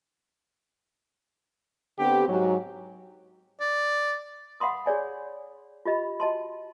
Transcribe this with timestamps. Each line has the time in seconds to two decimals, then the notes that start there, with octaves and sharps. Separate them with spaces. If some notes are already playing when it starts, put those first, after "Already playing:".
1.98 D3 B3 C4 G4
2.28 G#2 F#3
3.60 D5
4.60 F5 F#5 B5 C6 D#6
4.86 G#4 C#5 D5 G#5
5.85 F4 G4 D#5 B5
6.20 F#4 D#5 A5 C6